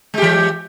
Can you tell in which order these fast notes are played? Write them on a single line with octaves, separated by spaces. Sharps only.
G#3 G4 E3